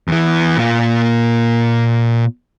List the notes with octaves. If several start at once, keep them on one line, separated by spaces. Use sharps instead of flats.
E2 E3
A#2 F4